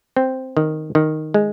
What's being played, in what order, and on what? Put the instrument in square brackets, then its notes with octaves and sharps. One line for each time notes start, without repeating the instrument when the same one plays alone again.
[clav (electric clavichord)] C4
D#3
D#3
G#3